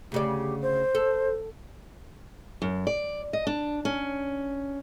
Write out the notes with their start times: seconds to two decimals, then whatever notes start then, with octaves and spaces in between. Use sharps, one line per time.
0.12 D2 C#3 G4 D5
0.62 C5
0.95 A4
2.62 F#2
2.87 D5
3.33 D#5
3.47 D4
3.85 C#4